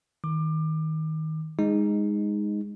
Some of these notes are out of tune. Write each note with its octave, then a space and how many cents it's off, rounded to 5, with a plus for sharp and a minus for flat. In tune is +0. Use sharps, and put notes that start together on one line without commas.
D#3 +20 D6 +25
G#3 -10 D#4 +0